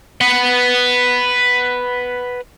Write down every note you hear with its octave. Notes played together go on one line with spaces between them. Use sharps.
B4 F#5